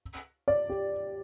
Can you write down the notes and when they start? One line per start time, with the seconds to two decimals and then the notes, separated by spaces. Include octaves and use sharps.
0.48 D5
0.70 G4